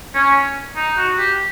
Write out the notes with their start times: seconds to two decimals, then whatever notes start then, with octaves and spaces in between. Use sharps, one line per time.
0.15 C#4
0.76 D#4
0.97 F#4
1.17 G4